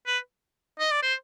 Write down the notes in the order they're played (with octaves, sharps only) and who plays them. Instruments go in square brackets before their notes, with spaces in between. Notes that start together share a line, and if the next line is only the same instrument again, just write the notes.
[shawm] B4
D#5
D5
C5